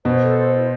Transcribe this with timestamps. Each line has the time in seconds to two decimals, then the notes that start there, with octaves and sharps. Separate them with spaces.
0.05 B2 C5
0.22 A4
0.37 C5
0.54 E4